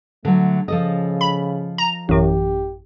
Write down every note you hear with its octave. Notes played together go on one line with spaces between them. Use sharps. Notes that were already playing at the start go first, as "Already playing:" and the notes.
D3 F#3 A3
C#3 F3 A4 D#5
B5
A#5
A1 F#2 G4